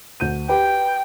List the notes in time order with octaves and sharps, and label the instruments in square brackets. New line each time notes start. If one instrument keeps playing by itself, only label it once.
[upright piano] D2 G6 D#7
[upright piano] G4 B4 [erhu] G5